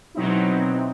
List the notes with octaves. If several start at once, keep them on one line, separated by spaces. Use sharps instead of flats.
B2 F#3 C4 D#4 E4